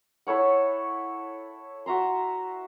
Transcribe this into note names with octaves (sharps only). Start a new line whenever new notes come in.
E4 A4 C#5 F#5
F#4 E5 A#5 C6